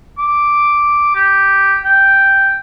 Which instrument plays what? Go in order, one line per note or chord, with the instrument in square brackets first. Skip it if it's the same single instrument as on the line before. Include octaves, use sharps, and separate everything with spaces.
[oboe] D6
G4
G5